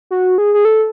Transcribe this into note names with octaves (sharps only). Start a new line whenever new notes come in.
F#4
G#4
G#4
A4